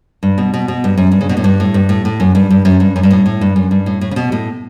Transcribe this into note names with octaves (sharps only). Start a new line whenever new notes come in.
G2
B2
B2
B2
G2
F#2
G2
C#3
B2
A2
G2
A2
G2
A2
A2
F#2
G2
G2
F#2
G2
F#2
G2
A2
A2
G2
F#2
G2
A2
A2
C#3
B2
A2